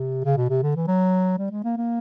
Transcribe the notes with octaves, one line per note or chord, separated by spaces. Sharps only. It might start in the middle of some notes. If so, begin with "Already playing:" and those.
Already playing: C3
C#3
B2
C3
D3
E3
F#3
G3
G#3
A#3
A#3